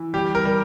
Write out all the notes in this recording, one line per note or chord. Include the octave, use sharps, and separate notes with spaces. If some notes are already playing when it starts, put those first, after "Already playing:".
Already playing: E3
G3 G4
A#4
G3